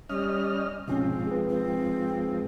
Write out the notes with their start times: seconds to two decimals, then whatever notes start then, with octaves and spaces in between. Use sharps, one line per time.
0.10 G3 C#4 D#5 F6
0.88 G#2 B2 F3 C4 C#4
1.27 G#4 B4
1.49 C4